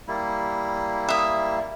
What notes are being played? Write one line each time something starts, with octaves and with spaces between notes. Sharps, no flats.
G3 A#3 E4
E5 D#6